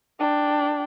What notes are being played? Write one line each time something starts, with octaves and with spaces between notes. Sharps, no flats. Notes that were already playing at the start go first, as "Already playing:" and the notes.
D4 G5